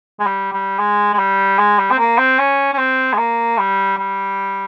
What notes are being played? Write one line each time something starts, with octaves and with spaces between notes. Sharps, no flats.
G#3
G3
G3
G#3
G#3
G3
G#3
G3
C4
A#3
C4
C#4
C#4
C4
G#3
A#3
G3
G3